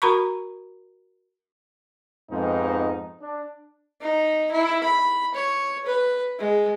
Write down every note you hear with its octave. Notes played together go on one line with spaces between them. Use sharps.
F#4 A#4 A#5 B5 C#6
F2 G#2 B3 D#4
D4
D#4
E4
B5
C#5
B4
G#3